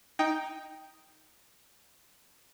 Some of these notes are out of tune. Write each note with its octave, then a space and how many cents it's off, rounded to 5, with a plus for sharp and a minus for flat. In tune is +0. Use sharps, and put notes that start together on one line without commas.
D#4 +5 G5 +0